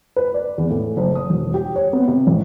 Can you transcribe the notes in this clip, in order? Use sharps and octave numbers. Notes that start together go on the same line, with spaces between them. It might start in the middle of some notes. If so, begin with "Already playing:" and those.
B4
D5
E2
A2
F#1
D#6
E1
G4
C#5
B3
C3
A1